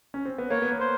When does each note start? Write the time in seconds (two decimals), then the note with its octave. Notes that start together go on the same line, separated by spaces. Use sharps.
0.14 C#4
0.25 C4
0.38 B3
0.50 A#3 C#5
0.62 B3
0.70 A#3
0.80 C5